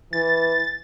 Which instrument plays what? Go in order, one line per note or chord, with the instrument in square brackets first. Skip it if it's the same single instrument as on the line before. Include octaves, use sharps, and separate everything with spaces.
[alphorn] E3 [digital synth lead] A6